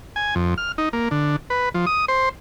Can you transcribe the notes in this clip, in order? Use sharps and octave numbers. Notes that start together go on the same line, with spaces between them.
G#5
F2
F6
D#4
A#3
D3
B4
F3
D#6
C5